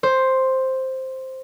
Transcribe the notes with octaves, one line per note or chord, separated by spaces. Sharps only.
C5